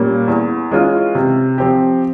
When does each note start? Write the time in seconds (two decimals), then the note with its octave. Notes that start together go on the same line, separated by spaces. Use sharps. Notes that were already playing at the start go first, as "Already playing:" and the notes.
Already playing: A#2 G3 A#3 C#4
0.28 E2
0.71 E3 G#3 C#4 F4
1.15 C3
1.58 F3 C4 G4